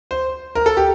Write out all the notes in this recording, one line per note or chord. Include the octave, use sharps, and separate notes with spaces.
C5
A#4
A4
G4